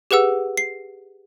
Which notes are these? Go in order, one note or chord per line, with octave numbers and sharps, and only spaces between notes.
G4 G#4 B4 F#5 E6
C7